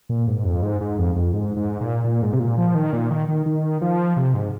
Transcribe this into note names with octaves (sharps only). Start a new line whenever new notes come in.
A#2
G#2
F2
G#2
G#2
F2
F2
G#2
G#2
A#2
A#2
G#2
C3
A#2
F3
D#3
A#2
D#3
D#3
D#3
F3
C3
G#2